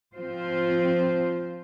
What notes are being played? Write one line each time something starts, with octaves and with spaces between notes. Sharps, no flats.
F3 C4 F4 C5